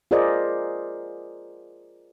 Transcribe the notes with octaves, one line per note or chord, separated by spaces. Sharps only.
F4 G#4 A#4 C5 D5 D#5